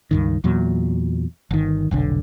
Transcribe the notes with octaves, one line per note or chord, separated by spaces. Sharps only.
C#2 G2 D#3
E2 A#2 F#3
G1 D#3
F1 B1 D3